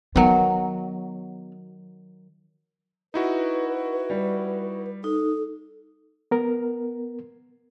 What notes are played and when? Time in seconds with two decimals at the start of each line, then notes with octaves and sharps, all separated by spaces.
0.16 D#3 F#3 B3
3.14 D#4 E4 F#4 B4
4.10 G3
5.04 D#4 A4
6.31 B3 A#4